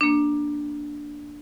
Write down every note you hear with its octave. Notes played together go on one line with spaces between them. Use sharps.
A#3 D4